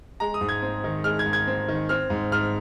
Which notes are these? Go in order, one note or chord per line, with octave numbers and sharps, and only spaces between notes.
G#3 A#5
D#6
G#2
G#6
C4
D#3
G#3 F6
G#6
G#2
G#6
C4
D#3
C4 F6
G#2
G#2 F6